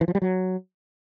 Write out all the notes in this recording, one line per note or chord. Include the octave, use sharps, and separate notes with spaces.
E3
F3
G3
F#3